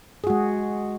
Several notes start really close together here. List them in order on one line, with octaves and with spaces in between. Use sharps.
G#4 F#4 G#3